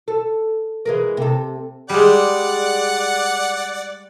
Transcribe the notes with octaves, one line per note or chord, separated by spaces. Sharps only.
A4
E3 G#3 A#4
C3 A4
G3 G#3 D5 F#5